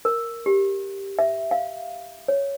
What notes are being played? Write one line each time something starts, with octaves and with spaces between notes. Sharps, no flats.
A#4
G4
E5
F5
C#5